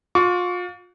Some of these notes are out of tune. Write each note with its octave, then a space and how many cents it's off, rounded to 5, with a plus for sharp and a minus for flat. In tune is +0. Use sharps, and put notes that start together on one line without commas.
F4 +35 C#6 +45